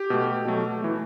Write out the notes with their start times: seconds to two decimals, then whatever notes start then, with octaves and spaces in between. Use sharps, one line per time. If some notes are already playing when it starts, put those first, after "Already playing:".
Already playing: G4
0.10 B2 A3
0.45 B2 F#3 A3
0.82 E3 A3